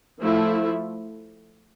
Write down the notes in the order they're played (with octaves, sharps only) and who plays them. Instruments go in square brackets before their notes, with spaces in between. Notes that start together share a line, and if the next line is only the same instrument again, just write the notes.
[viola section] F3 A3 E4